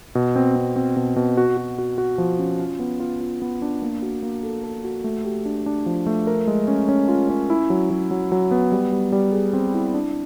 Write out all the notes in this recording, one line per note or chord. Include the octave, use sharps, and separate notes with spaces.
B2
C4
C4
C4
B2
B2
F#4
F#4
F#4
F#4
F3
C#4
F4
B3
F4
F4
B3
D4
A#3
F#4
A#3
A4
A4
F#4
A3
G4
D4
D4
F3
A3
A#4
G#3
C#4
C#4
F4
C#4
E4
F#3
F#3
F#3
F#3
B3
G3
G3
G3
G#4
C4
E4
D4